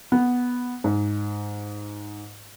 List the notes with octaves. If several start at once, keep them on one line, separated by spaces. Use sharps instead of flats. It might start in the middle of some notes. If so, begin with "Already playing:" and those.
B3
G#2